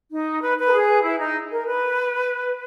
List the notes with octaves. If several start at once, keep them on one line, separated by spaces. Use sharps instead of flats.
D#4
B4
B4
A#4
G#4
E4
D#4
A#4
B4